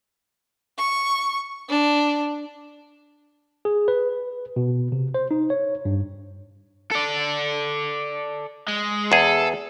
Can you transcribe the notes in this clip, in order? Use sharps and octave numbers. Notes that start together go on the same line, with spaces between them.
C#6
D4
G#4
B4
B2
C3
C5
D#4
C#5
G2
A4 D5
G#3
E2 G#4 A4